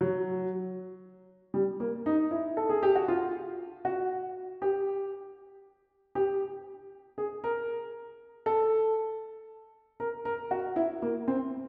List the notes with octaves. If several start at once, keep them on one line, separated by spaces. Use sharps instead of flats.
F#3
G3
A#3
D#4
E4
A4
G#4
G4
F#4
F4
F#4
G4
G4
G#4
A#4
A4
A#4
A#4
F#4
E4
A#3
C4